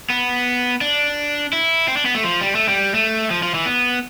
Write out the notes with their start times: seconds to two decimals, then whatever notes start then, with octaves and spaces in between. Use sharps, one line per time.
0.10 B3
0.81 D4
1.53 E4
1.88 C4
1.97 D4
2.06 B3
2.15 A3
2.24 F3
2.41 G3
2.55 A3
2.68 G3
2.94 A3
3.31 F3
3.43 F3
3.54 E3
3.66 B3